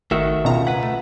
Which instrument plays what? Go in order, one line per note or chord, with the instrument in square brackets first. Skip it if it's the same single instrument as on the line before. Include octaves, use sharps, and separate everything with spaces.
[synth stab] G#1 [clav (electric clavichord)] D#3 [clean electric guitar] A3 F#4 E5
[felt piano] C#2 F4 [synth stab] B2 A#5
[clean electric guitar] B4 F#5 [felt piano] B6
[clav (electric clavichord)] A3